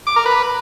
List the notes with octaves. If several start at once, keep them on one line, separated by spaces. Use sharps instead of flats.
D6
A#4
B4